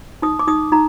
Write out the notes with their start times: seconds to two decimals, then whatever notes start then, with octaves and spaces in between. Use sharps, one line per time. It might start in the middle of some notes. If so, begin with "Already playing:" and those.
0.22 D#4 D#6
0.39 D6
0.48 D#4 D#6
0.72 D#4 A#5